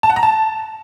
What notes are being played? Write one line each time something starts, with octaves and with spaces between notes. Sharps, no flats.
A5
F#5
A#5
A5